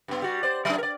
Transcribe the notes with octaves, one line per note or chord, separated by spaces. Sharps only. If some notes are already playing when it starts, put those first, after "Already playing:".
G2 B3
G3 F#4
C5 D5
F#3 D4
A#4 D5